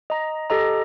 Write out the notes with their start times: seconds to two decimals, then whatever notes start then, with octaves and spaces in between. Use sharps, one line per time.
0.10 D#5 A#5
0.50 G4 A4 D#5 A#5